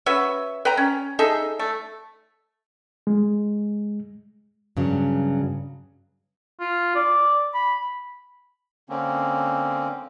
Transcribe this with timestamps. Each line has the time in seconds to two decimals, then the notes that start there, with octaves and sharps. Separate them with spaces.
0.06 C#4 F#4 B4 E5
0.65 B4 G5 A#5
0.77 C#4
1.19 D#4 G#4 A4 E5
1.59 A3
3.07 G#3
4.77 G2 C#3 F#3
6.60 F4
6.95 D5
7.54 B5
8.89 D3 A#3 C4 C#4